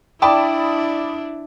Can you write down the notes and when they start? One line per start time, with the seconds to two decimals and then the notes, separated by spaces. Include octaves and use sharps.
0.22 D4 E4 D5 G5 A5 B5 D6 D#6